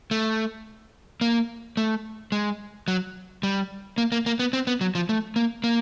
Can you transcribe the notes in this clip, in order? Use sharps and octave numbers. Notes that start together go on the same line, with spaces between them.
A3
A#3
A3
G#3
F#3
G3
A#3
A#3
A#3
B3
C4
B3
F#3
F3
A3
A#3
A#3